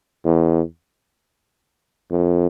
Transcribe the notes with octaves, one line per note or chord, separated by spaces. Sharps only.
E2
F2